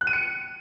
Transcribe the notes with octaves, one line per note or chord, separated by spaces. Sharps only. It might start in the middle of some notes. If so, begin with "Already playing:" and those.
F#6
D#7
C#7